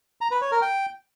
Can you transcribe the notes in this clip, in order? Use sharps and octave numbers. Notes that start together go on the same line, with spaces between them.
A#5
B4
C#5
A#4
G5